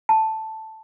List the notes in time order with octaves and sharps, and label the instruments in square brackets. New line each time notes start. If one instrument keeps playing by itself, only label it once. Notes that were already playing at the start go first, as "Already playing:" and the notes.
[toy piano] A5